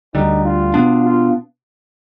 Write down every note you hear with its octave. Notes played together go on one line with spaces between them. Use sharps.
D2 D3 G3 D#4
F4
B2 B3 D4
F4